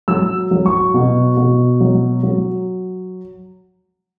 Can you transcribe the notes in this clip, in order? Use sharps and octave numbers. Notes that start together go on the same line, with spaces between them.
F#3 E6
F#3
C#6
B2
B2
F#3
F#3